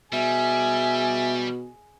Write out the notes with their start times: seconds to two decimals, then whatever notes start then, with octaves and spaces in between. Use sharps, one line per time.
0.13 B2 G3 G#4 E5